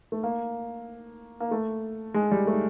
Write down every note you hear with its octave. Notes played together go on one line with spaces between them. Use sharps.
A3
A#3
A#3
A3
G#3
G3
A3